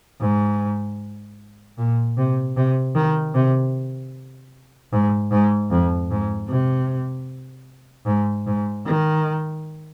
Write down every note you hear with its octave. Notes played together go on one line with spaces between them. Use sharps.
G#2
A#2
C3
C3
D#3
C3
G#2
G#2
F2
G#2
C3
G#2
G#2
D#3